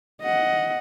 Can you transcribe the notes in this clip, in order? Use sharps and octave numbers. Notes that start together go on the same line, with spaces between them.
D#5 F#5